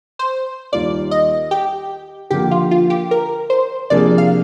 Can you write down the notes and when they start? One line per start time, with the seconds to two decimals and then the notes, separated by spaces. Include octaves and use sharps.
0.19 C5
0.72 D#2 D#3 G3 A#3 F4 D5
1.11 D#5
1.51 G4
2.31 D3 F3 A#3 G4
2.51 F4
2.71 F4
2.90 G4
3.11 A#4
3.50 C5
3.90 C3 F3 A#3 D4 G#4 D5
4.18 F5